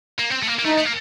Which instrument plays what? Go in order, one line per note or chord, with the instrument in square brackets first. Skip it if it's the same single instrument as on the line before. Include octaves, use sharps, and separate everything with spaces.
[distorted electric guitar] A#3
C4
A3
A#3
A#3
[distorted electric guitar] A3 [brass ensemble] D#4
[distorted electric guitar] A3
A#3